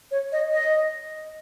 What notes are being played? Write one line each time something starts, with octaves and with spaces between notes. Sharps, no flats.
C#5
D#5
D#5